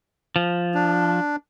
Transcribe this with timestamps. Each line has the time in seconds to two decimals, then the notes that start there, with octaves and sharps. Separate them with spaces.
0.36 F3
0.74 D4